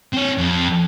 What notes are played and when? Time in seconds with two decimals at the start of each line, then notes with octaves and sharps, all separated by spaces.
0.14 C4 C#5
0.39 F2